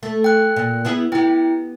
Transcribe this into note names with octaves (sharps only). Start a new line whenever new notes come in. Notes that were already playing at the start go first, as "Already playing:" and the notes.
A3
G5 F#6
A#2
B3 E4 G#4
B3 E4 G4 G5